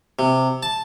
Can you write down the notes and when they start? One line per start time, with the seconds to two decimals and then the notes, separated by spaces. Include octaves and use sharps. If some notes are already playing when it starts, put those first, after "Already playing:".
0.19 C3
0.63 A5